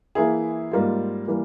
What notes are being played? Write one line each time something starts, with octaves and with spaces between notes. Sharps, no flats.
E3 A#3 E4 G#4
G#2 G3 A#3 F4
E3 G3 A#3